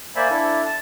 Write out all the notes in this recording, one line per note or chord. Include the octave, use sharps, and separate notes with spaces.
A#3 C5 D5 E5 G#5 B5
D4 E4 A4
A5